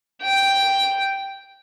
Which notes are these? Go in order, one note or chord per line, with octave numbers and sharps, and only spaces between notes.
G5